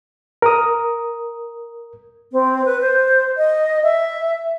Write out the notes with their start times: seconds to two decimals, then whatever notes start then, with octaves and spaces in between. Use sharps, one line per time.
0.42 A#4 D#6
2.32 C4
2.65 B4
2.81 C5
3.37 D#5
3.83 E5